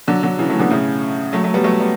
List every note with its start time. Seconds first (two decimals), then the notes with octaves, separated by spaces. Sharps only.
0.08 D3 F#3
0.23 D3 F#3
0.39 C#3 E3
0.50 F#3 A3
0.59 B2 D3
0.71 A2 C#3
1.33 F#3 A3
1.44 F#3 A3
1.54 G3 B3
1.64 F#3 A3
1.81 G3 B3